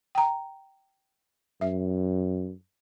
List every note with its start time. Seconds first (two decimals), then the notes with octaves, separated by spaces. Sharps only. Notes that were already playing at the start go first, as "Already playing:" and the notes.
0.15 G5 A#5
1.61 F#2 E5